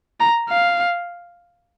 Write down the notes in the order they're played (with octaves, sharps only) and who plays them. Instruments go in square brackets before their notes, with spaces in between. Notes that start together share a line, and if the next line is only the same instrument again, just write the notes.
[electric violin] A#5
F5